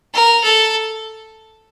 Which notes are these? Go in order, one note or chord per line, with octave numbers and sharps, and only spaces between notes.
A#4
A4